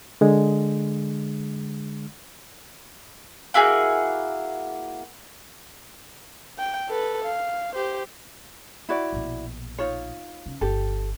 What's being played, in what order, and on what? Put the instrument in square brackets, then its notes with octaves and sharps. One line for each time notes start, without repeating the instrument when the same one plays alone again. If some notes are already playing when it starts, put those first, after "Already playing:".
[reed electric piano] D3 G#3
[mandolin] A#3 E4 F#4 G#4
[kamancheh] G5
A4 B4
F5
G4 C5
[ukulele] E4 F#4 D5
[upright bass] A#1 B2
[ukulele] D#4 F4 C#5
[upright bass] C#3
[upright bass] G1 [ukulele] G4 A4